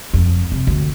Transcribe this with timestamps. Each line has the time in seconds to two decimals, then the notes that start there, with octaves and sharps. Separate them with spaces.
0.14 F2
0.52 C3
0.67 D2